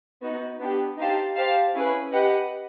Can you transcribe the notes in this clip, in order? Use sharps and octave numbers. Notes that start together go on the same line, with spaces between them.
B3 D#4 F#4
B3 D4 G4
D#4 G4 C5 F5 A5
G4 C5 F5 A5
C#4 E4 G#4 B4
G4 B4 D#5 F#5